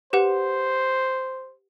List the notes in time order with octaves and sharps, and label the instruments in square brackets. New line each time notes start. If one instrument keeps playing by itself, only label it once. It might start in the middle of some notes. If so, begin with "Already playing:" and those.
[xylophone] G4 B4 F#5 [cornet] C5